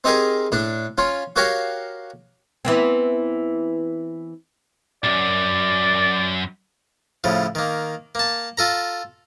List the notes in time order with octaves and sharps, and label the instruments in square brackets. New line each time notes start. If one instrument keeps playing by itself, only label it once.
[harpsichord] C4 D#4 G4 G#4 A#4
A2 D4
C#4 F4
F#4 G4 A#4 C#5 F5 G5
[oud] E3 B3 C4
[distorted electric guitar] B1 F#2 [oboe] D5
[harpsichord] A2 C#3 F3
D#3 A#3
A#3 A5
F4 A4 A#5